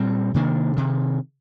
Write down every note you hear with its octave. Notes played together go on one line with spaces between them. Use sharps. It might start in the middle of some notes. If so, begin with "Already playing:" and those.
Already playing: A#2 G3 C4
C3 D#3 A#3 D4
C3 D#3